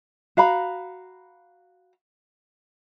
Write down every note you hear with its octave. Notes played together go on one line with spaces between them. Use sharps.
F#4 F5 A#5 B5